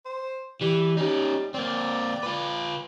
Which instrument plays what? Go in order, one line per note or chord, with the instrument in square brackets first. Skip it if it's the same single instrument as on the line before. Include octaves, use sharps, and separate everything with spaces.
[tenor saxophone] C5
[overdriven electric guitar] E3 [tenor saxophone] G3
[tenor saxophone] G3 [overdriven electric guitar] C#4 D#4
[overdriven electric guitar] A#3 C4 [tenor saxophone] D5
[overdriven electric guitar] F4 B4